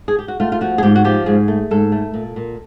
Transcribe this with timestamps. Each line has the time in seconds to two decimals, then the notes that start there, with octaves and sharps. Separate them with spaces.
0.08 G#4
0.19 G4
0.28 F#4
0.40 A3 F4
0.52 F4
0.61 F3 F#4
0.78 G#4
0.83 G#2 G4
0.95 F#4
1.05 F3 G4
1.26 G#2 G#4
1.48 A3
1.71 G#2 A4
1.92 A3
2.14 A#2
2.36 A#2